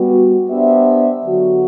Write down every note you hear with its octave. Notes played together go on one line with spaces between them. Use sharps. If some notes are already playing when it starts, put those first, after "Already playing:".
Already playing: G3 B3 F#4
B3 D4 G4 C5 E5
D3 F#3 B3 F#4